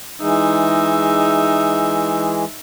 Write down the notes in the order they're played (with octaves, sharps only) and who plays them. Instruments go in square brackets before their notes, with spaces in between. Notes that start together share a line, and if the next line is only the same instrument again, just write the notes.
[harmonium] E3 G#3 G#4 [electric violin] D#4 E5